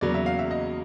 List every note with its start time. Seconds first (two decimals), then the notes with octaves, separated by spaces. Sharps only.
0.01 E2 C#3 F#3 A#3 D5
0.14 E5
0.26 F5
0.39 E5
0.51 D#5